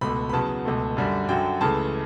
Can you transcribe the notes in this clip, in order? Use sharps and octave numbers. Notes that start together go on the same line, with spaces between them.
C#2 B2 A3 B5
B5
E2 C#3 F#3 B3 A5
C#2 B2 A3
F#2 D3 G3
F#2 D3 F#3 G5
C#2 C#3 E3 A3 A5